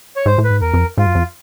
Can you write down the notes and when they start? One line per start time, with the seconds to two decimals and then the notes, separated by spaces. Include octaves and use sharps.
0.16 C#5
0.26 G#2 C5
0.38 A2
0.44 B4
0.50 G#2
0.61 E2 A#4
0.74 F2
0.98 G#2 F4
1.06 F#2
1.15 F2